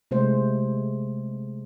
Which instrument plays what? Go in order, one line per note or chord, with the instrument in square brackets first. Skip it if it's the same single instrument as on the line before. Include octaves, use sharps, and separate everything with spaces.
[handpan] C3 G#3 A3 C5